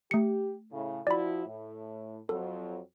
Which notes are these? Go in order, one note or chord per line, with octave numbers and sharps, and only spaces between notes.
A3 G4 C#7
A2 C#3
F3 E4 F#4 D5 B5
A2
F2 F#3 A4